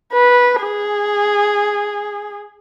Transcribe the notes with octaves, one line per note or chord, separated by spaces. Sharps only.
B4
G#4